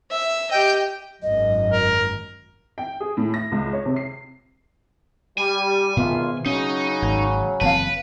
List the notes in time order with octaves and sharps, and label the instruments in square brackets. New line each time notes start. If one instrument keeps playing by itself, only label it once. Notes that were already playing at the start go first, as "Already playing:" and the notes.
[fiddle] E5
[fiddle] G4 D#5 [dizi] G5
[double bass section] G#1 F#2 [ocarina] D#5
[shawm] A#4
[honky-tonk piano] G5
G#4
A2
A#6
C#2
C#5
C3
C7
[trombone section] G3 [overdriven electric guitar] G#5
[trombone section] G#1 F4 [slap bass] B2 D#3 [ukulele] B4 E5
[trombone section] C#3 F#3 [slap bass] C#4 [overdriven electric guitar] D#4
[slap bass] G#1
[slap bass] F#1 E3 C4 [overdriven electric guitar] B4 [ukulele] F5 A5